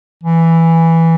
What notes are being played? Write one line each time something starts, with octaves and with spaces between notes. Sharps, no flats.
E3